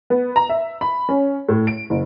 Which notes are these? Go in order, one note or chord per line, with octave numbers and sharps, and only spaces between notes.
B3
A#5
E5
B5
C#4
A2
D7
F#1